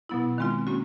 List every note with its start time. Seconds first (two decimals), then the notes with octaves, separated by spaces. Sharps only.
0.09 B2 F#3 B3 E4
0.38 D#3 G#3 C4 F4
0.67 A#3 C#4 F#4